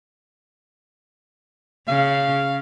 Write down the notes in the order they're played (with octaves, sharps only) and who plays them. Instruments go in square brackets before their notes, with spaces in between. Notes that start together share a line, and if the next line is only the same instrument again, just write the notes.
[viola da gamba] C#3 [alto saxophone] F5